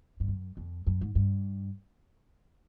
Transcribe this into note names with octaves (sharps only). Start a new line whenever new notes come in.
G2
F#2
F2
F#2
G#2
G2